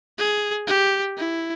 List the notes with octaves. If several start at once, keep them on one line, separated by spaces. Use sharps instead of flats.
G#4
G4
E4